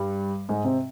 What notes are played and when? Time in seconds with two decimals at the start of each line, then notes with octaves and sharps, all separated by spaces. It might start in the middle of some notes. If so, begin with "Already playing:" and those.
Already playing: G2 G3
0.49 G#2 G#3
0.64 C3 C4